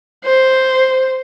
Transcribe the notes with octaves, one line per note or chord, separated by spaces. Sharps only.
C5